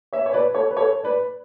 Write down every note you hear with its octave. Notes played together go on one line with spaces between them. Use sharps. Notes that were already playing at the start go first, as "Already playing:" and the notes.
C#5 E5
C#5
B4 D5
A4 C#5
B4
A4 C#5
B4 D5